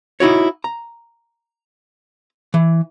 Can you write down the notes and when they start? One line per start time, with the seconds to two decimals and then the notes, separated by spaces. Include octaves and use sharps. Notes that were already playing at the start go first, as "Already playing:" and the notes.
0.20 D#4 E4 F#4 C#5
0.64 A#5
2.54 E3